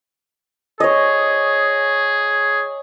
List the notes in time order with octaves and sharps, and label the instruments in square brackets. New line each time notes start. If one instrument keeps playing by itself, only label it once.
[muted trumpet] G#4 [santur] C#5 D#5